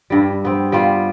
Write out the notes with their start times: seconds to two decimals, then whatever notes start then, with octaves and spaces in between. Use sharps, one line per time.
0.10 G2 G3
0.45 B3 C4
0.72 G3 B3 F4